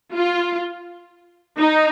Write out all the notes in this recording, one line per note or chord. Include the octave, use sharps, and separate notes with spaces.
F4
D#4